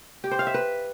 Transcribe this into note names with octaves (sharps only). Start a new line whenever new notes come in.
G4
C5
F5
E5
B4